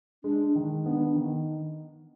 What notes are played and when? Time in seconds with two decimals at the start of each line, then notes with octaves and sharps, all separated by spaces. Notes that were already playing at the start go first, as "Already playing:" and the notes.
0.24 G#3 D4
0.55 D#3
0.86 B3 D4
1.16 D#3